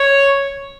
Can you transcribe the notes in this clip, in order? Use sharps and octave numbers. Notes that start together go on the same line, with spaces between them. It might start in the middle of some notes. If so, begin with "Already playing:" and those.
Already playing: C#5